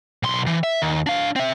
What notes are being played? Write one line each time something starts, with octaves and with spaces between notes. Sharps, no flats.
B1 C6
E3
E5
D#2
D4 F5
C4 E5